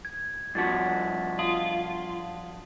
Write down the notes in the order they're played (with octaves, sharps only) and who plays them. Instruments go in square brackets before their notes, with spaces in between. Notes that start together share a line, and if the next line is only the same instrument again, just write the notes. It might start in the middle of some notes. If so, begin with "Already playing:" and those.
[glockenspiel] G#6
[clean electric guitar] G2 F3 F#4 [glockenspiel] A6 B6
[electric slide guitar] F4 [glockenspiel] A5 D#6 F#7